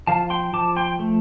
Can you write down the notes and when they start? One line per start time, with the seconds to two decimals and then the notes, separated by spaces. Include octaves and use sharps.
0.07 F3 F5 A5
0.30 G5 C6
0.53 F3 A5 D6
0.76 G5 C6
0.99 A3